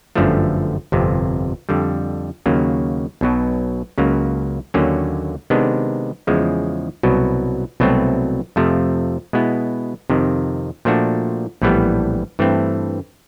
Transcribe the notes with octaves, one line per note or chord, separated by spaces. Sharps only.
G1 F#2 D3 F3 A3
G1 F2 C3
F2 D3 G3
D#2 C#3 F#3 A#3
B1 B2 F#3
C#2 C#3 F#3 A#3
D#2 D3 F#3 A#3 C#4
C3 D#3 G#3 B3 D4
E2 C#3 F3 G#3
C2 B2 F#3
C2 B2 F#3 A3 C4
F2 C3 F3 A3
B2 G#3 B3 E4
F2 C3 D#3
A#2 F3 A3 D4 F#4
A#1 A2 E3 G3 B3
G2 E3 A3 C4